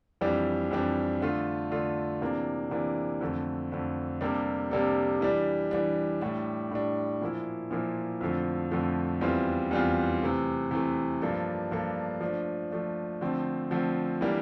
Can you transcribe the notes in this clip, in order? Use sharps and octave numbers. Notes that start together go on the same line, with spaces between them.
F2 E3 G3 D4
F2 E3 G3 D4
D3 A3 D4 F4
D3 A3 D4 F4
C3 E3 A#3 D4
C3 E3 A#3 D4
F2 D3 A3
F2 D3 A3
C3 G3 A#3 D4 A4
C3 G3 A#3 D4 A4
E3 G3 D4
E3 G3 D4
A2 G3 D4
A2 G3 D4
A#2 F3 A#3 E4
A#2 F3 A#3 E4
F2 D3 F3 A3
F2 D3 F3 A3
E2 E3 G3 C4 F4
E2 E3 G3 C4 F4
C3 E3 A3
C3 E3 A3
G2 F3 A#3 D4 A4
G2 F3 A#3 D4 A4
F3 A3 D4
F3 A3 D4
D3 F3 A3 C4
D3 F3 A3 C4
E3 G3 A#3 D4